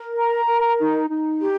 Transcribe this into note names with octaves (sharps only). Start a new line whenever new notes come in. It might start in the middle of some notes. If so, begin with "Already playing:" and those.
Already playing: A#4
A#5
A#4
D#4
D#4
G4